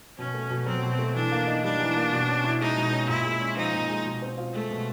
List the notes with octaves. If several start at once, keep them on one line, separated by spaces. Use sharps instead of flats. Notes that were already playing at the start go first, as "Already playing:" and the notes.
B2 C#4
A3
B2
F#3 C4
B2
A3
E3 D4
A#3
D#4
G3 D4
E3
A#3
B2
C#4
E4
G#3 D#4
B2
C#4
A#2 E4
G#3
C#4
F3 D#4
A#2
G#3
B2
C4
F4
G#3 A3
B2